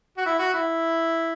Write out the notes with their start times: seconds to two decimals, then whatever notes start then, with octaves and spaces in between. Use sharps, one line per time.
0.17 F#4
0.26 E4
0.39 F#4
0.54 E4